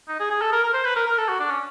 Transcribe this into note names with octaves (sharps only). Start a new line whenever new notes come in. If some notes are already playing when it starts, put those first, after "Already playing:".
D#4
G#4
G#4
A4
A#4
A#4
C5
B4
A#4
A#4
A4
F#4
D4
C#4